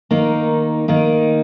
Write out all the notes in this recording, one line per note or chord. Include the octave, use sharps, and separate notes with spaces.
D#3 A#3 D#4
D#3 A#3 D#4